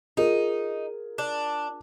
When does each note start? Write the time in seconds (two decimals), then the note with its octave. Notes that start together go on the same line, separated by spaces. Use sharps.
0.17 D#4 F4 G#4 A#4
1.18 D4